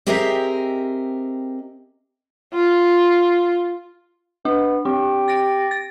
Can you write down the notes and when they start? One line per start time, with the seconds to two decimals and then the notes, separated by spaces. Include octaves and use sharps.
0.07 C4 G4 G#4 A#4 D#5 E5
2.54 F4
4.45 B3 D4
4.85 C4 G4
5.28 A6 A#6 D7
5.71 A6